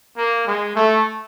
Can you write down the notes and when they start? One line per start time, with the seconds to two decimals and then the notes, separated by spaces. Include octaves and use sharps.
0.17 A#3
0.47 G#3
0.76 A3